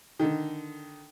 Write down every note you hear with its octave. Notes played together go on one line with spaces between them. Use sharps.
D3 D#3